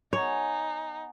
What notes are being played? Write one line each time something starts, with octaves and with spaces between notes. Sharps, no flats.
B3 D#4 G#4 C#5